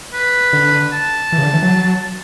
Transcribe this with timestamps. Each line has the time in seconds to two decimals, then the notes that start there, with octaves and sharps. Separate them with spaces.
0.14 B4
0.53 D3
0.93 A5
1.32 E3
1.38 C#3
1.44 D3
1.54 E3
1.62 F#3